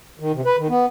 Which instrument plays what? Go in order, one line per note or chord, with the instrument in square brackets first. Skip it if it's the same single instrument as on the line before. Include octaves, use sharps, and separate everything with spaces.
[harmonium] D#3
C3
B4
D#3
B3